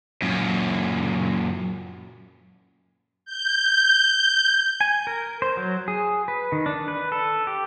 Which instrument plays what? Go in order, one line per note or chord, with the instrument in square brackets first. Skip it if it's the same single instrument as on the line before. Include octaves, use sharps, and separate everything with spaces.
[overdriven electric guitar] F#2 A#2
[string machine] G6
[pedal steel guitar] G#5
A#4
C5
F#3
G#4
B4
D#3
D4
B4
A4
G4